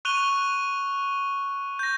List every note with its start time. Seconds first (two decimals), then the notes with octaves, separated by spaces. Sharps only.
0.05 C#6 F#6 D#7 F7 G7
1.79 G6 A#6